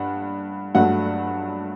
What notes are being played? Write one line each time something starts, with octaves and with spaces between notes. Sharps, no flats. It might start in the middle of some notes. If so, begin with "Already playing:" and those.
Already playing: G2 F#5
G2 F#3 A3 F#5